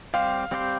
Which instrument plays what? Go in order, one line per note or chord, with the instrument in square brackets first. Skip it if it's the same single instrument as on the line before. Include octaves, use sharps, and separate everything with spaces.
[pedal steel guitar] G3 C4 G4 C5 [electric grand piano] F5
[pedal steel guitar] G3 C4 G4 C5